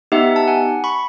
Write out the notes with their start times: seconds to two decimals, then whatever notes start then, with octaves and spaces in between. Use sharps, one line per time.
0.12 B3 D#4 G4 E5 F#5
0.36 A5
0.47 F#5 G#5
0.84 B5 C#6